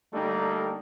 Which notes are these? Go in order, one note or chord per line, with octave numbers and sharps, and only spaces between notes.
D3 G3 A3 A#3 D4 D#4